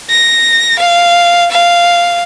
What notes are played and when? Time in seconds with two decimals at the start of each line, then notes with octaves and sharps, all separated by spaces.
0.10 A#6
0.79 F5
1.51 F5